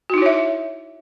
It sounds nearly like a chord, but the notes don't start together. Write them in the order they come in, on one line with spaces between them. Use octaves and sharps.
F#4 D#4 E4 C#5 E5